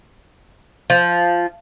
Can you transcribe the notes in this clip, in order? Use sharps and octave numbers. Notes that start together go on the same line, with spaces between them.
F3